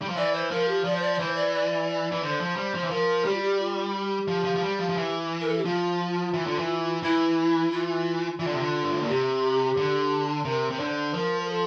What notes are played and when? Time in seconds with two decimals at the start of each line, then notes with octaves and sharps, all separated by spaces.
0.02 G3
0.09 F3
0.17 E3 D5
0.34 C5
0.51 F3 A#4
0.68 G4
0.85 F3 D5
0.95 C5
1.02 D5
1.14 D5
1.20 E3 C5
1.36 D5
1.54 D5
1.89 D5
2.12 E3
2.22 D3 C5
2.40 F3
2.56 G3
2.74 F3
2.84 E3
2.90 F3 A#4
3.25 G3 G4
3.34 F4
3.42 G4
3.60 F4
3.94 G4
4.28 F3
4.45 F3
4.56 F3
4.63 G3
4.79 F3
4.89 F3
4.97 E3
5.41 A#4
5.48 A4
5.58 G4
5.65 F3 F4
6.34 E3
6.47 D3
6.59 E3
7.03 E3 E4
7.71 F4
8.39 E3 F4
8.47 D3
8.53 C3
8.60 D3
8.83 G2
8.91 A2
9.00 A#2
9.08 C3 G4
9.77 D3
10.45 C3 A#4
10.70 C3 A#4
10.79 D3 C5
11.14 F3 A#4
11.41 A#4
11.49 A4